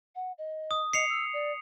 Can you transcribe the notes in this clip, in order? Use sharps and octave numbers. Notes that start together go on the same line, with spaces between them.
F#5
D#5
D#6
D#5 C7 C#7 F7
E6
D5